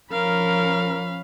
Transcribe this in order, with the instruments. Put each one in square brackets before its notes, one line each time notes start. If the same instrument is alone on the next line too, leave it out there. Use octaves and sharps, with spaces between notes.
[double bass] F3 C#4 [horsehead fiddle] A#4 [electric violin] F5 B5